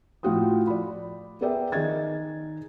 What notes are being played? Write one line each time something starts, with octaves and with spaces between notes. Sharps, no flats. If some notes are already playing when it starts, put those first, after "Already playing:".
A2 F3 F4 F#4 G5 D#6
D5 B5
B3 G#4 A#4 D5 E5 G5
D#3 D#4 G#4 D#5 G#6 A6